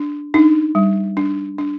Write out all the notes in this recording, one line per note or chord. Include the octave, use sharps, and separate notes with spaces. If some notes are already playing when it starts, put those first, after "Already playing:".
Already playing: D4
D4 D#4
G3
D4
D4